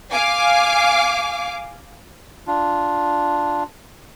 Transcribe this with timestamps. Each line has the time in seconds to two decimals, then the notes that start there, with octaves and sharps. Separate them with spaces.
0.11 F5 G#5 D6
2.47 D4 F4